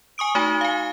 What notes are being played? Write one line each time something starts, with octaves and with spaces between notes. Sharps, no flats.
G#5 C#6 D#6 D7
A3 D#4 F#4
F5 G#5